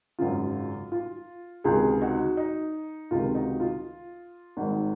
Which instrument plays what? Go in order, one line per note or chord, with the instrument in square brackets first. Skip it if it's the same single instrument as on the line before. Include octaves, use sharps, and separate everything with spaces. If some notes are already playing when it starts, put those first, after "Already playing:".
[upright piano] G#1 F#2 C#3 F4
F4
C#2 C3 D#3 F4 G#4
D#4 F#4
D#4
C#2 C3 D#3 F4
D#4 F#4
F4
G#1 G#2 D#3